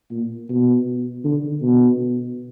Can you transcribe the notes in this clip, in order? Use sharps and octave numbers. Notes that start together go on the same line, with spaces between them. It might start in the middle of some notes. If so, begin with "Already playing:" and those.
A#2
B2
D3
B2